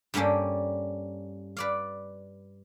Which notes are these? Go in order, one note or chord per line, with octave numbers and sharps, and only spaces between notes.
G2 G3 A#3 C#4 D4 A4
B4 D5 F5